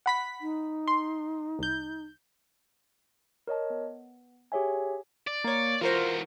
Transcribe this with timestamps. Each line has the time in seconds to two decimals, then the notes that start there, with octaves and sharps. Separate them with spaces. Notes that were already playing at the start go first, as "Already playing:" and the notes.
0.06 F#5 B5 B6
0.41 D#4
0.87 C6
1.59 C2 G6
3.47 A#4 C#5 D#5 A5
3.70 B3
4.52 G4 G#4 C#5 E5 G#5
5.27 D5
5.44 A#3 C#5
5.81 E3 F4 F#4 A#4 C5